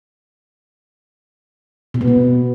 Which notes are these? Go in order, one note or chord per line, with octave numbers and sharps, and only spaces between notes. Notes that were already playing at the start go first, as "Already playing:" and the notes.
B2
B3
B2